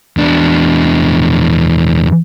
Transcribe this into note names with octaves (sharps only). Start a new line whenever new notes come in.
E2 D4